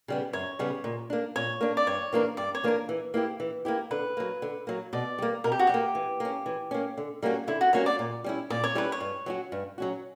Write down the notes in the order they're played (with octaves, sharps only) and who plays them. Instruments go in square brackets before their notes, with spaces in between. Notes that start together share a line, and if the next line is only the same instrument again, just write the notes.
[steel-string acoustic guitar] C#3 G3 B3
[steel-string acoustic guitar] F#2 [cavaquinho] C#5
[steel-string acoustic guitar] C#3 G3 B3
A#2
A#3 D4
[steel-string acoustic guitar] A#2 [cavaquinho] C#5
[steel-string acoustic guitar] A#3 D4
[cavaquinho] D5
[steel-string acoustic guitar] G2 [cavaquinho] C#5
[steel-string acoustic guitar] E3 A#3 D4 A#4
[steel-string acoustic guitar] G2 [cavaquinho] D5
[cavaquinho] C#5
[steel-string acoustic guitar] E3 A#3 D4 A#4
E3
A#3 E4 G4
E3
A#3 E4 G4
[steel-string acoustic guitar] D3 [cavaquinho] B4
[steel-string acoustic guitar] F#3 A#3
D3
F#3 A#3
[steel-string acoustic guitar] B2 [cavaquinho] D5
[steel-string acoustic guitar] G3 A#3
[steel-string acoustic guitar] B2 [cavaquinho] A#4
[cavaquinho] G4
F#4
[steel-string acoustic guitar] G3 [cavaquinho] G4
[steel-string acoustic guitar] A#3
E3
A#3 C#4
E3
A#3 C#4
D3
G3 A#3 C#4 F#4
[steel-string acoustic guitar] D3 [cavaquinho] E4
[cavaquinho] F#4
[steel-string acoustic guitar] G3 A#3 C#4 F#4 [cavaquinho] C#5
[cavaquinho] D5
[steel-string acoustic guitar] A#2
G3 C#4 E4
[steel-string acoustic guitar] A#2 [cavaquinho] D5
[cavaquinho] C#5
[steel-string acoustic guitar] G3 C#4 E4 [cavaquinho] B4
[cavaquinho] C#5
[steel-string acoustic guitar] G2
F#3 C#4 F#4
G2
F#3 C#4 F#4